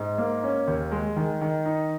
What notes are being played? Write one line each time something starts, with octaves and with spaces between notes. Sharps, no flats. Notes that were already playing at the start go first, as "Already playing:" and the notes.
Already playing: G#2
A#3
C#4
D#2
G#3
D#3
D#3
D#4